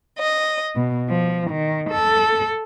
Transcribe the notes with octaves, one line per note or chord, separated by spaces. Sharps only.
D#5
B2
F3
D#3
A4